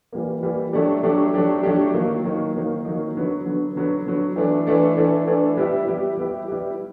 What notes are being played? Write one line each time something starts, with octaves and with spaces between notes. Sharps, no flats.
E3 G3 A#3
E3 G3 A#3
F#3 A3 D4 G4
F#3 A3 D4 G4
F#3 A3 D4 G4
F#3 A3 D4 G4
D#3 F#3 A#3 D#4
D#3 F#3 A#3 D#4
D#3 F#3 A#3 D#4
D#3 F#3 A#3 D#4
D3 F#3 B3
D3 F#3 B3
D3 F#3 B3
D3 F#3 B3
E3 A3 D4
E3 A3 D4
E3 A3 D4
E3 A3 D4
G3 B3 E4 G4
G3 B3 E4 G4
G3 B3 E4 G4
G3 B3 E4 G4